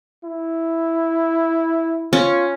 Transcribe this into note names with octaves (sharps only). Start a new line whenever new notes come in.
E4
C#4 F4